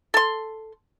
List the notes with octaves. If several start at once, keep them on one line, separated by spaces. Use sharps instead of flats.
A4 C6